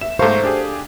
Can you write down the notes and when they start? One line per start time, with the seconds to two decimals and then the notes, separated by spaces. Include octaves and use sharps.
0.01 E5 E7
0.19 G#2 A3 A4 C5 F5 A#5 C#6
0.43 D4 G4 G#4